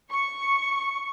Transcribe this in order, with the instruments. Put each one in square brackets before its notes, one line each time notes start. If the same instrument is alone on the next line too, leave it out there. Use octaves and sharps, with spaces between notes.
[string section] C#6